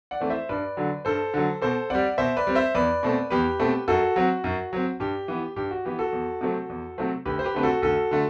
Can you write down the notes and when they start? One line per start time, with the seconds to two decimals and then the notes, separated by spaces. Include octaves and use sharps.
0.11 D5 F#5
0.20 E3 A3 C4
0.30 C5 E5
0.49 G2 B4 D5
0.77 D3 F#3
1.05 G2 A4 C5
1.34 D3 F#3
1.62 B2 A4 C5
1.90 G3 C4 D5 F#5
2.18 B2 C5 E5
2.37 B4 D5
2.47 G3 C4
2.55 C5 E5
2.75 E2 B4 D5
3.03 B2 A3 C4
3.30 E2 G4 B4
3.60 B2 A3 C4
3.88 F#2 F#4 A4
4.16 F#3 C4 F#4
4.44 F#2
4.73 F#3 C4
5.00 G2 G4
5.28 E3 B3
5.56 G2 G4
5.71 F#4
5.85 E3 B3 G4
5.99 F#4 A4
6.13 E2
6.41 C3 F#3 A3 C4
6.69 E2
6.98 C3 F#3 A3 C4
7.26 D2 G4 B4
7.39 C5
7.44 G4 B4
7.55 D3 A3 C4 B4
7.63 F#4 A4
7.82 D2 F#4 A4
8.11 D3 A3